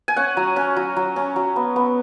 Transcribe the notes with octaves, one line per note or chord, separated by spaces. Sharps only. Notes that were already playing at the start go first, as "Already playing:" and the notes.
G#5
C#4 F#5
F#3
C#4
F#3
F#3
C#4
F#3
B3
B3